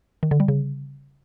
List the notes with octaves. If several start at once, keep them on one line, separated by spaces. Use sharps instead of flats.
D#3
D3
G3
C#3